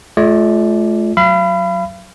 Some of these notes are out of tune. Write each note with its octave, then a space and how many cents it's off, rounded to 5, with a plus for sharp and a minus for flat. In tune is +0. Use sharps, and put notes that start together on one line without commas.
A3 -40 F4 +0 D5 +0
F#3 +0 F5 -40 B5 +15